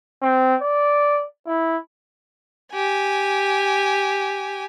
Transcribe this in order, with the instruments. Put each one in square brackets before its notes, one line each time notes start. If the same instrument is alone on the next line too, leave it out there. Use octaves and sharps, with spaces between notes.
[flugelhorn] C4
D5
E4
[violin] G4 G#5